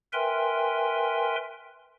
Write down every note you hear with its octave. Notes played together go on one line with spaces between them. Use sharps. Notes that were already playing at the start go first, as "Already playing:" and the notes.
A#4 B4 E5 G5 G#5 C6